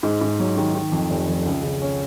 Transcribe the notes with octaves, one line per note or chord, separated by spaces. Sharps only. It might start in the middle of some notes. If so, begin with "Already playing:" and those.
G#2
G#2
F#3
D#3
D#3
F2
F1
F2
C#2
C#3
C#4